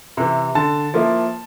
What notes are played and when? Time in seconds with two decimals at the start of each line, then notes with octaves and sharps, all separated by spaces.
0.17 C3 E3
0.55 D3 A5
0.94 F3 A#3 E4